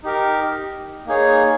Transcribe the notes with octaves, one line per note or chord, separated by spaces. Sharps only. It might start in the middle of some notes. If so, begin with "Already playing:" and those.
D#4 G4 A#4
A#3 D#4 G#4 C#5